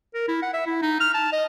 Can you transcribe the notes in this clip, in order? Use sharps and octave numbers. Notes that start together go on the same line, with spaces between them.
A#4
E4
F#5
E5
E4
D#4
F6
A5
D#5